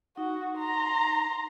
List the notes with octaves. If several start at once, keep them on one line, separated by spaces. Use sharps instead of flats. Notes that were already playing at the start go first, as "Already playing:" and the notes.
D#4 F#4
A#5 C6